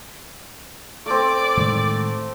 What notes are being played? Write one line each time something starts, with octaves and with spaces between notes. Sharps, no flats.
A3 C4 D5 D6
A2 D#3 G#3